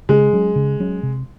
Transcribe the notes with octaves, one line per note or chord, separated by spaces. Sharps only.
C#3 G#3
F#3 C#4
C#3
F#3 C#4
C3